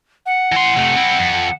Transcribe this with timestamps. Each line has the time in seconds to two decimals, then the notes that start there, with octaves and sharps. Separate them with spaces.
0.26 F#5
0.52 E3 C6
0.77 C3 A3
0.96 C4 E4
1.19 F2